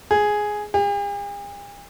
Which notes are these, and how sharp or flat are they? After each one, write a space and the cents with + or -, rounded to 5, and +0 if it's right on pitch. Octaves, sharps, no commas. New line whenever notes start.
G#4 +5
G#4 -45